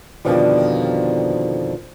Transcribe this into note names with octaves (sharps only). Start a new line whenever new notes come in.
F2 B2 D3 D#3 F3 G3